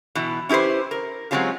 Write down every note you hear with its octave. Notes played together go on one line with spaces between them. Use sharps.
B2 E3
C#4 E4 G4 B4 C5
A#4
F#3 G#3 C4 C#4 F4 G4